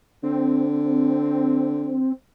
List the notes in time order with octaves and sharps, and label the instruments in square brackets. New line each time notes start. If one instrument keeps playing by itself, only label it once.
[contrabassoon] D3 [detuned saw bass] C4